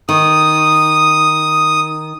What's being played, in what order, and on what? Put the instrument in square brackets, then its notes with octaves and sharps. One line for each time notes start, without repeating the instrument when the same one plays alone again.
[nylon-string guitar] D#3 [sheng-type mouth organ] D#6